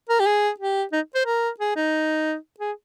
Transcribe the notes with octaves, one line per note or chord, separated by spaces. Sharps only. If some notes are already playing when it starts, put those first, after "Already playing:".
A#4
G4
G#4
G4
D#4
C5
A#4
G#4
D#4
G#4